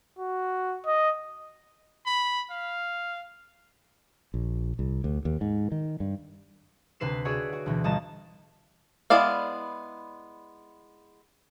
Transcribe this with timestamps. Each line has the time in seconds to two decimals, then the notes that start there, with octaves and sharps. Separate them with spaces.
0.19 F#4
0.86 D#5
2.06 B5
2.51 F5
4.34 A#1
4.79 C2
5.04 D2
5.25 D#2
5.41 G#2
5.72 D#3
6.00 G2
7.00 D2 C3 B4 C7 E7
7.25 F#4 G#4 C#5 D5 E5
7.53 F#4
7.66 D2 B2 E3
7.84 G1 D#5 A5 A#5 E7
9.10 G#3 B3 E4 D5 F5